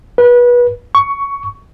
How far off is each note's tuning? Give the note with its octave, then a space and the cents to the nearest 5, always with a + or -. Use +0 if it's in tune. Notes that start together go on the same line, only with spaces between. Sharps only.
B4 -25
C#6 +15